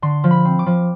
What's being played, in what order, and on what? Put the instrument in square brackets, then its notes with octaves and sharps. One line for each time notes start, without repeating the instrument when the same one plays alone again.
[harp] D3 C6
F3
B5
C4
D6
F3